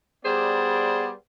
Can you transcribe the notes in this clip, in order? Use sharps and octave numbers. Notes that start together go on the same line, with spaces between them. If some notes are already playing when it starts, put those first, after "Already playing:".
G3 B3 G#4 C5 D5